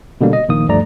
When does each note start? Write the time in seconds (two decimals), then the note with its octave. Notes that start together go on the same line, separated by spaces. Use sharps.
0.21 B2 D3 G3 A#3
0.33 D#5
0.49 A#1 D#3 A#3 D#6
0.68 D2 G2 F3 A3 D5 A#5